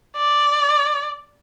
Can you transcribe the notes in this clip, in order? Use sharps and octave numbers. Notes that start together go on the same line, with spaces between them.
D5